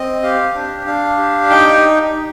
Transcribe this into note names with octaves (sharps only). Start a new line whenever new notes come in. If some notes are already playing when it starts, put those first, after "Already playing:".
Already playing: C4 D#5
G4 F5
D4
D4 F5
G4
D#4 G5